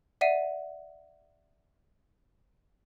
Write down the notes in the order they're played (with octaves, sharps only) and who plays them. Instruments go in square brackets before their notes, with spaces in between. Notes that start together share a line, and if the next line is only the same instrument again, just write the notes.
[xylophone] D5 E5 F#5 C7 D#7